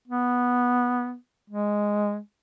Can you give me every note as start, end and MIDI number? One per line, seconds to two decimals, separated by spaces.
0.07 1.15 59
1.50 2.18 56